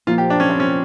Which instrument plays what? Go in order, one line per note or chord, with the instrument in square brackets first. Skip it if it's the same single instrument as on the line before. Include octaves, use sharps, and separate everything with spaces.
[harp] A#2 F3 A#3 [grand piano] F4
[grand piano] G4
D4
C#4
C4
C#4